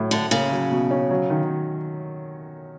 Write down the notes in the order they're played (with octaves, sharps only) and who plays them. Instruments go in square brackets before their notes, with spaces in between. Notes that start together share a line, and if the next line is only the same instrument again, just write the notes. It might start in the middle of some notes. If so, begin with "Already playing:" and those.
Already playing: [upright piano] A2 F#3
[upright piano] A2 [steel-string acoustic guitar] D3
[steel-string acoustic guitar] C#3 [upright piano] A#3
[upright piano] F#3
B2
C#4
F#3
D#3